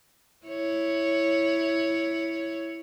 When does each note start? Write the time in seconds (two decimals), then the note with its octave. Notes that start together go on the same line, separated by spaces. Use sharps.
0.46 E4 C#5